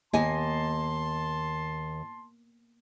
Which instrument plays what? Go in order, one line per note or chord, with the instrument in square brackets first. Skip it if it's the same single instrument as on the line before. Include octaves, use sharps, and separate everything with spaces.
[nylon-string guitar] D#2 D#5 G#5 [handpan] A#3 B3 [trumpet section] A5 C6